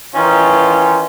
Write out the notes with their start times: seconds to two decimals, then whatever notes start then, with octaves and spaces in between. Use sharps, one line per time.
0.15 D#3 E3 C#4 D#4 F4